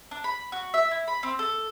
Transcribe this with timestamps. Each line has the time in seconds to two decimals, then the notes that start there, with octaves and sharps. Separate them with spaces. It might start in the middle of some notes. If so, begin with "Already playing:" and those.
0.11 D4
0.24 B5
0.52 F#4
0.74 E5
0.91 E4
1.08 B5
1.23 C4
1.39 A4